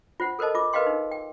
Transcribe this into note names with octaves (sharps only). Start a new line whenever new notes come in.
F4 C5 F#5
A4 A#4 C5 D#5 A5
F4 D6
A#4 B4 D#5 F5 G5 C6
D#4 A#4
G5